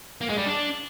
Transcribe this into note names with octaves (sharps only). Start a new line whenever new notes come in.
A#3
G#3
G3
D4